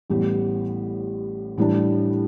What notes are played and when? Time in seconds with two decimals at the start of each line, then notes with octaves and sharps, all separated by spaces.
0.10 A1 A2 G3 B3 G4
1.58 A2 E3 G3 D4